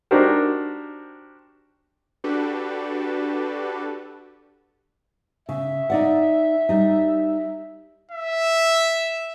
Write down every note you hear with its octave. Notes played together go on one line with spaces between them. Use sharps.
D4 D#4 F#4 G4 A#4 C5
D4 F#4 G4 A4 B4
C#3 E5
D#4 D5 F#5
G3 D#4
E5